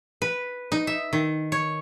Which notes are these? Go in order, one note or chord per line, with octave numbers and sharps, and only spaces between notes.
B4
D#4
E5
D#3
C#5